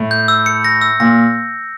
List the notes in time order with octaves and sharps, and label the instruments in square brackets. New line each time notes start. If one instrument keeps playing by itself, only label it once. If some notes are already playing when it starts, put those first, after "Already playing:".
Already playing: [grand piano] A2
[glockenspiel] G6
E6
C#7
A#6
E6
[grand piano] A#2 [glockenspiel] A#6